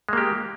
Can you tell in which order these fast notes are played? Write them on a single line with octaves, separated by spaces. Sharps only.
G#3 A#3 G4